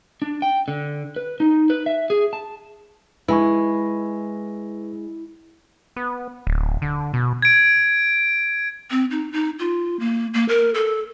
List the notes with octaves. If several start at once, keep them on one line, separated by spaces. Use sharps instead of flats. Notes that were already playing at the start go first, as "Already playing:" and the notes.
D4
G5
D3
B4
D#4
B4
E5
G#4
A5
G#3 E4 B4 G#5 C#6
B3
D1
D3
B2
G#6 D7
C4
D#4
D#4
F4
A#3
A#3
A#4
A4